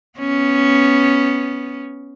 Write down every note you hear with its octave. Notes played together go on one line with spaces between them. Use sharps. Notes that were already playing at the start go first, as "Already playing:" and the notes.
B3 C#4